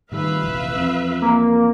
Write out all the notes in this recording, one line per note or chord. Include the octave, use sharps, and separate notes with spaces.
A2 D#3 G3 B4 E5 F5
F1 A#1 E3
E2 F3 C4
A#3